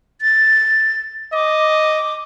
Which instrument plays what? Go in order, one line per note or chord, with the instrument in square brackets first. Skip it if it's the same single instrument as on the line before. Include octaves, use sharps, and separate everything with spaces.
[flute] A6
[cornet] D#5 [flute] D6